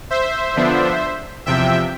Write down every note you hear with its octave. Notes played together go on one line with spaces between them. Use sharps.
C5 E5
D3 F3 B3 D4
E2 C3 F3 E5 G5